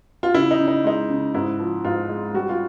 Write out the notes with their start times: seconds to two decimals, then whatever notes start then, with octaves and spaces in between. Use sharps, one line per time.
0.23 F4
0.34 C#3 E4
0.51 D#4
0.60 C#3
0.68 D#4
0.84 G#3 D#4
1.10 C#3
1.35 G#2 E4
1.59 F3
1.85 G#2 F4
2.09 G#3
2.34 G3 F#4
2.49 F4